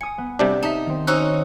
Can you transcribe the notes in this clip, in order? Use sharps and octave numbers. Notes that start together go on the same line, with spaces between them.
G#5 D#6 C#7
B3
C3 G3 D4 A4 G6
D#4 E5 A5
D#3 C4
C#4 D#4 F#4 C5 E6 F#6